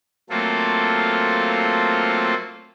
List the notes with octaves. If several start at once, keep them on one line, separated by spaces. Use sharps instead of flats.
F#3 A3 A#3 C4 F4 A4